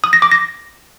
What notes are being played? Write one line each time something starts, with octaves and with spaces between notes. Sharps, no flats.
D#6
A#6
D6
A#6